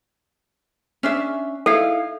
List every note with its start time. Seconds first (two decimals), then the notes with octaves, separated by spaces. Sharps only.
1.03 C#4 D4 E5
1.66 D#4 E4 A4 F5